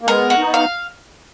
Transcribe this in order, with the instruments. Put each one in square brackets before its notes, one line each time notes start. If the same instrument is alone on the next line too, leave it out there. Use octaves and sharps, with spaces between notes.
[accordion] A#3
[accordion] G#3 B3 [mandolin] A#4
[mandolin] F#4
[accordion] B3 D#4
[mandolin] F5